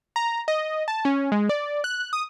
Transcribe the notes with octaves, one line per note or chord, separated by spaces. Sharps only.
A#5
D#5
A5
C#4
G#3
D5
F#6
D#6